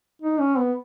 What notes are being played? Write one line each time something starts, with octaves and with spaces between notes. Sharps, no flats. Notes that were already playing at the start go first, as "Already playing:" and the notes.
D#4
C#4
B3